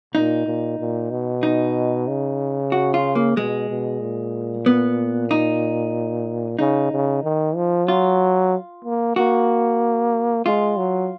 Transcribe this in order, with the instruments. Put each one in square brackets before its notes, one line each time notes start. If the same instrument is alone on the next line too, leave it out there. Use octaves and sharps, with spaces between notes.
[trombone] A#2 [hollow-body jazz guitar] D#4
[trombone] A#2
A#2
B2
[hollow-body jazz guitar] D#4
[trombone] C#3
[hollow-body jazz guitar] F#4
F4
A#3
[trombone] B2 [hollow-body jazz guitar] G#3
[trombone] B2
A#2
[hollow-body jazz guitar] B3
D#4
[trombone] C#3 [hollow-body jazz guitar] D#4
[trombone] C#3
D#3
F3
[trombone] F#3 [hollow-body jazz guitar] F4
[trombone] A#3
[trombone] A#3 [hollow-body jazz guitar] F#4
[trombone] G#3 [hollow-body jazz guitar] F4
[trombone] F#3